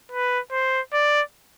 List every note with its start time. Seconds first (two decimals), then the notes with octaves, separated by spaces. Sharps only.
0.11 B4
0.52 C5
0.93 D5